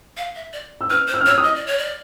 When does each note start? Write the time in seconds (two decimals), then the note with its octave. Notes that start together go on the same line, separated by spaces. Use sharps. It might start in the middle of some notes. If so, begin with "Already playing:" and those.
0.17 F5
0.35 E5
0.53 D5
0.81 E6
0.90 B4 F6
1.08 C5
1.14 E6
1.21 F6
1.26 C#5 E6
1.38 D#6
1.44 D#5
1.55 D5
1.67 C#5
1.78 D5